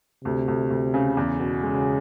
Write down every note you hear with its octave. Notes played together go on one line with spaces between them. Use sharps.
D2 C3
D2
D2
C#3
E2
B2
C#3 G#3